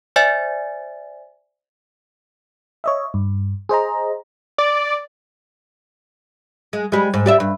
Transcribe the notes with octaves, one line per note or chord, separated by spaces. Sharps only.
C5 D5 E5 G#5 A6
C#5 D#5 E5
G2
G#4 C5 D#5 A#5
D5
G#3
G3 G#3
G#2
G4 D5 E5
G2